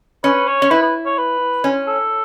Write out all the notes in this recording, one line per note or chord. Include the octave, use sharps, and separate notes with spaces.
C#4 B4
C#5
C#4
E4 B4
B4
C#5
B4
C#4
A4